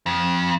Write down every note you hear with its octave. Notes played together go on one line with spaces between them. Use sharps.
F2